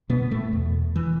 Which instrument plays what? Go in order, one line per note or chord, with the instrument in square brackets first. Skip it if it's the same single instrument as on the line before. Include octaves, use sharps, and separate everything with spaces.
[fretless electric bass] B2 B3
A2 A3
E2 B2
E3